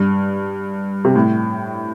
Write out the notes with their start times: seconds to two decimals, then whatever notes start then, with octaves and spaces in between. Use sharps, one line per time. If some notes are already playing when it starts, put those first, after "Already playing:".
Already playing: G2
1.05 C3
1.15 A2